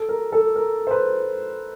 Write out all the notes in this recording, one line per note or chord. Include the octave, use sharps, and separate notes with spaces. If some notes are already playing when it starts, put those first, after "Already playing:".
Already playing: A4
A#4
A4
A#4
C5
B4